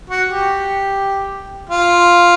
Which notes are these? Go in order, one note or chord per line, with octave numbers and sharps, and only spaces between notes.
F#4
G4
F4